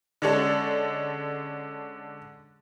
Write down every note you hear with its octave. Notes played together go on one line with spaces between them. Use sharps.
D3 G#3 C#4 D4 A4